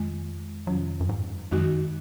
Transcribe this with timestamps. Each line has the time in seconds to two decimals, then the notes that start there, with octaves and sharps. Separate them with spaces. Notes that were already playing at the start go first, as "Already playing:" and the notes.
Already playing: F2 D#3 G#3
0.66 F2 C3 D#3 F#3 G#3 C#4
1.00 F#2
1.09 G#2
1.51 F#2 D#3 G#3 D#4 F#4